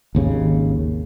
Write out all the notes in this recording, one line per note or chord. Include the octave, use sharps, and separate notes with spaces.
G#1 D#2 C#3